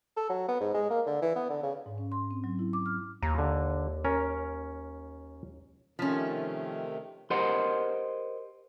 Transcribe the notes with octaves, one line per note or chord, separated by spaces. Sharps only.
A4
F#3
B3
G#2
G#3
A#3
D3
E3
B3
D3
C#3
G#2
C#4
C6
C4
F#3
E4
D6
F6
D#2 A#5
D3
C#4 A#4
C3 D#3 F3 A3 C#4
G4 A#4 C5 D#5 F#5 C6